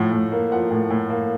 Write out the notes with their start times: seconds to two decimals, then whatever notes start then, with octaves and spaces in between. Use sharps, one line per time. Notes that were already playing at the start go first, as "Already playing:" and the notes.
Already playing: A2 F3 F#5
0.12 A2
0.32 A#3
0.52 F3 F#5
0.71 A2
0.90 A2
1.10 A#3